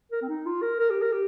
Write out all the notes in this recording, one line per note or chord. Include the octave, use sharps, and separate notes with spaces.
A#4
C4
D#4
F4
A#4
A#4
G4
A#4
G4